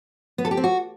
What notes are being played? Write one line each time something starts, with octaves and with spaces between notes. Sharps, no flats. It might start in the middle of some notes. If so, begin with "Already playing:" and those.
B3
A4
G4
C4
F#4